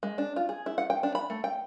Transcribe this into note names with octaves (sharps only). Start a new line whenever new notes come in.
G#3
D4
F4
G#4
E4
F#5
G5
D4
B5
A3
G5